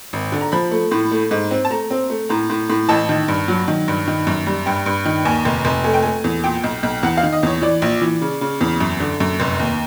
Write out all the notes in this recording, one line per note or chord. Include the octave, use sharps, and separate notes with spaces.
G#1
D3
A#5
F3 B5
A3
A2
A3
G#2
C4
A5
A3 A#5
C4
A3
A2 A#5
A2
A2
A1 A5
D#3
G2
F#3
D#3
G2
D#3
F#2
G3
G2 G5
G2
D#3
D#2 G#5
F1
F1
A3 G#5
G5
A3 G#5
E2
A#2 G5
B1
B1
E2 F#5
F5
D#3
D#5
E2 C#5
E3 D5
A#1
E3
C#3
C#3
E2
F#2
D3
F#2
F1
D#2